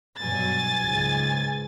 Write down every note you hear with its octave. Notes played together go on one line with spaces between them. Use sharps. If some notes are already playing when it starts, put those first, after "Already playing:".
G2 B2 F#3 G#5 A6
C#2 G#2